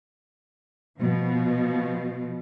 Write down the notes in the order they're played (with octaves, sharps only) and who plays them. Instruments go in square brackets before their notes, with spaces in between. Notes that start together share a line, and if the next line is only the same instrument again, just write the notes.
[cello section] B2 F3